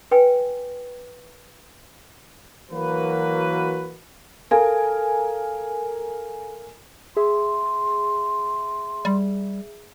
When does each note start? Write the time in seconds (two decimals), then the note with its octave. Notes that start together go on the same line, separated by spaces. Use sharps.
0.11 B4 G5 G#5
2.71 E3 F#3 A#3 F#4 A#4 B4
4.51 A4 A#4 F5 G#5
7.17 G#4 E5 C6
9.05 G3